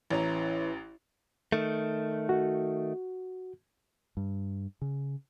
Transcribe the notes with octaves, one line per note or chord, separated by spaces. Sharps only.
A1 E3 C#4 A#5
D#3 A3
F#4
G2
C#3